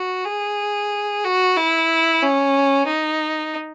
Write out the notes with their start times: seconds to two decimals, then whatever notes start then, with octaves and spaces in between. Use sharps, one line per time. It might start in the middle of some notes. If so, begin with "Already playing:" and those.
Already playing: F#4
0.25 G#4
1.24 F#4
1.56 E4
2.22 C#4
2.87 D#4